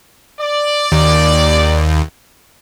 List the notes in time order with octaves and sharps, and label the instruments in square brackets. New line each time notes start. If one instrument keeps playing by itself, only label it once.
[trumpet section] D5
[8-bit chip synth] D#2